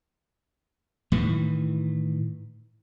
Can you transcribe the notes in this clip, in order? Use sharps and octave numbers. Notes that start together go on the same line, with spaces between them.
A2 D#3 E3